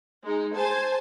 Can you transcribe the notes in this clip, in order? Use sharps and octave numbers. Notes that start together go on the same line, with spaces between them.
G#3 D#4
C5 G#5 A5